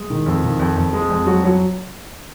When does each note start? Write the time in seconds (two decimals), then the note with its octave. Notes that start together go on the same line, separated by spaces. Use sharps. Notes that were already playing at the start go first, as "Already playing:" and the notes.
Already playing: G#3
0.10 D#3
0.26 F2
0.43 D#3
0.59 F2
0.76 F2
0.93 G#3
1.10 F2
1.26 F#3 F#4
1.44 F#3